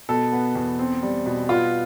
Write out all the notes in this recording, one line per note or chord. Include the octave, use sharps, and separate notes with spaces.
B2 A4
B3
E2
C4
G3
B2
B3 F4